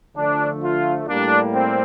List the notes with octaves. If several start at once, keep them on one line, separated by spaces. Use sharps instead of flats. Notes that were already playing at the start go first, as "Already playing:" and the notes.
D3 F3 A3 D4
F4
A2 G3 A#3 D4
C4